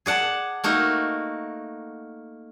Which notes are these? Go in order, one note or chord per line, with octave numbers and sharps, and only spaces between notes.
G#4 D5 F#5 A5
A3 A#3 D#4 F#4